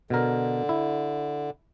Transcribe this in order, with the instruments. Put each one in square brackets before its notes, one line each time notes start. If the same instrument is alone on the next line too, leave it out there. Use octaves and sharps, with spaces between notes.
[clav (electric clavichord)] B2 A#4 [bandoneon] D3
[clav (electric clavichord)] E4